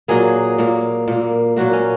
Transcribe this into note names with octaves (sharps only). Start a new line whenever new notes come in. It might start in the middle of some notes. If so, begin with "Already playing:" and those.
A#2 F#3 A#3 G#4
A#2 A#3
A#2 A#3
A#2 F#3 A#3 F#4
C#4